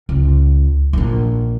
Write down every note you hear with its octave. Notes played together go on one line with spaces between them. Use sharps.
C#2
A#1 D4